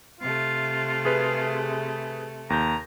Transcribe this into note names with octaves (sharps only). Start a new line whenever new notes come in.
C3 A3 F4
G#4 B4
D#2 A#5 G6